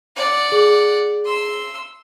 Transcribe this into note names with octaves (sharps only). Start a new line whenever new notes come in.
D5 F#5
G#4
C6 E6